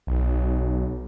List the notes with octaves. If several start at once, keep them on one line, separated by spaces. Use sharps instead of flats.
B1